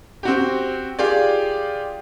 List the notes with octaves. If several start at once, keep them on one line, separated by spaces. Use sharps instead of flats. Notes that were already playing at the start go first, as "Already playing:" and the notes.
C4 F#4 G4
F4 G4 G#4 D5